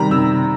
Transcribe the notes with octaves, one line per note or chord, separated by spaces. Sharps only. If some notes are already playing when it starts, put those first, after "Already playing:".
Already playing: C3 D#3 G3 A#5 B5
C3 E6